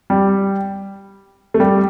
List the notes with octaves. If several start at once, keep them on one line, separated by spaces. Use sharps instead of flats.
G3
A3
G3